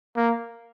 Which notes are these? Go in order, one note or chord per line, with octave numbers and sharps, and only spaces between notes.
A#3